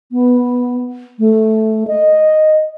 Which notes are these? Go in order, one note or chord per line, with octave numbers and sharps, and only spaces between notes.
B3
A3
D#5